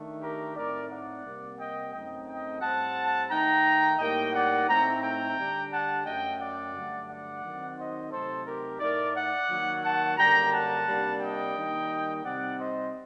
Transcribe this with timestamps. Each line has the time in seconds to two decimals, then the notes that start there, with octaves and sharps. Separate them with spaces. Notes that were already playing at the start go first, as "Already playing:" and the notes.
Already playing: D#3 A3 D4
0.21 G4 A#4
0.55 A2 A3 C4 D#4 A#4 D5
0.89 D5 F#5
1.24 C3 G3 A#3
1.58 D#5 G5
1.93 F#2 F#3 A3 C4 D#4 D#5 G5
2.27 D#5 G5
2.61 A2 G3 C4 F#5 A5
3.30 D#3 A3 D#4 G5 A#5
3.99 A2 G3 A#3 D#4 D#5 G5
4.34 D5 F#5
4.67 A2 A3 C4 D#4 G5 A#5
5.02 G5 A#5
5.36 D3 G3 D4
5.71 F#5 A5
6.05 F#2 F#3 A3 D#5 G5
6.39 D5 F#5
6.74 G2 D3 F#3 A3
7.08 D5 F#5
7.43 D#3 F#3 C4 D#4
7.77 C5 D#5
8.11 C3 F#3 A3 D#4 A4 C5
8.46 G4 A#4
8.80 A2 A3 D#4 A#4 D5
9.15 D5 F#5
9.49 D#3 F#3 A#3
9.83 F#5 A5
10.17 F#2 D3 G3 A#3 G5 A#5
10.52 F#5 A5
10.87 C3 G3 A#3 D4
11.20 D#5 G5
11.55 D#3 G3 A#3 D#4
12.24 C3 G3 C4 D#4 D5 F#5
12.58 C5 D#5